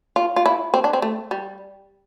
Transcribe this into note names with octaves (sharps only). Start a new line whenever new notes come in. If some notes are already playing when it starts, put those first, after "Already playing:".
F4
F4
E4
C4
D4
C4
A3
G3